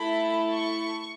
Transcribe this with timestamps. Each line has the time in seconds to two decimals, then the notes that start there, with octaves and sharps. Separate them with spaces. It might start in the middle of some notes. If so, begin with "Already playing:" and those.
Already playing: A3 E4 A4 B5
0.54 C#6